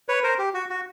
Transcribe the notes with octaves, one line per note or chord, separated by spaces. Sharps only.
B4 C#5
A#4 C5
G4
F#4
F#4